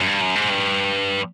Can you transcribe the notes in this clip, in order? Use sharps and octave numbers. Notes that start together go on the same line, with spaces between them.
F#2
G2
F#2
G#2
G2